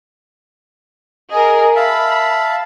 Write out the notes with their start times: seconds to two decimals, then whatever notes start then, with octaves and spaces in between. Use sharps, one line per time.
1.31 G#4 A#4 D#5
1.76 E5 F5 A5 B5